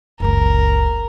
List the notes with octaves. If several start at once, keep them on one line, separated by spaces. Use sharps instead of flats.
F#1 C#2 A#4